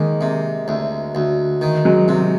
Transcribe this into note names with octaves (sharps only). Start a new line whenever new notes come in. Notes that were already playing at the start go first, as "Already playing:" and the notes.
Already playing: D#3 G#3 A#3
C3
D2
D2
D#3
F#3 G#3
C3 F#3 G#3